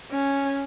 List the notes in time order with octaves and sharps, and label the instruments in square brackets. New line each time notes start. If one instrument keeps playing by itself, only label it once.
[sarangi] C#4